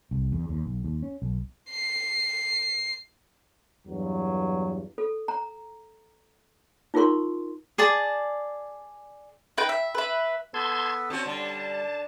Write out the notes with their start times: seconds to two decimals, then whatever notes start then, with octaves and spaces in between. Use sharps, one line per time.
0.11 C2
0.32 E2
0.49 D#2
0.66 B1
0.85 D#2
1.02 C#4
1.22 B1
1.71 C7
3.87 E2 G2 F#3
4.98 A4
5.28 A#5
6.94 D#4 F4 G#4 A#4 C6 C#6
7.78 G#4 D5 A5
9.58 D#4 B4 G5
9.69 E5
9.95 B4 E5
10.54 B3 A4 B4 A5 C6 G#6
11.10 C4 C#4 F#4 A5
11.26 D3 G3